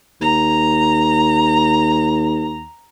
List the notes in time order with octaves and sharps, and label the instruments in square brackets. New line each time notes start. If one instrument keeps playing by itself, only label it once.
[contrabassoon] D#2 [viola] A#5